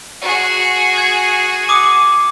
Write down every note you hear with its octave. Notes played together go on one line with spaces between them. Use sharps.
F#4 G#4
G#6
D6 D#6 D#7